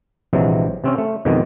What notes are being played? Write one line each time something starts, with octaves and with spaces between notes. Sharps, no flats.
A#1 C3 E3 F#3 G#3
C3 C4 C#4
A3
F2 B2 D#3 G#3